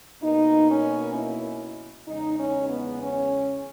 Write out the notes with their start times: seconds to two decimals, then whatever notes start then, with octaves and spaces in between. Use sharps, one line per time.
0.22 B2 A#3 D#4
0.69 C#4
1.15 E4
2.07 E2 C#3 G#3 D#4
2.39 C#4
2.69 B3
3.01 C#4